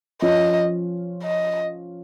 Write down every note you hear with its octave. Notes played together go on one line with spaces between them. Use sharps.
F3 C#4 F4 D#5
D#5